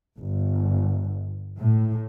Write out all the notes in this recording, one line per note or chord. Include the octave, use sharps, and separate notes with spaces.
G1
A2